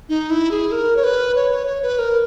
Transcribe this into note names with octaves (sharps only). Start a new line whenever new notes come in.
D#4
E4
G#4
A#4
C#5
B4
C#5
C#5
C#5
B4
A#4